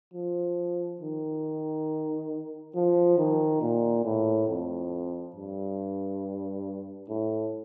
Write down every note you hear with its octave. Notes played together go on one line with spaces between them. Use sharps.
F3
D#3
F3
D#3
A#2
A2
F2
G2
A2